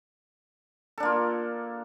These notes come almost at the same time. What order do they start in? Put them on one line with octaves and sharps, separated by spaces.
A4 D4 A#3 F4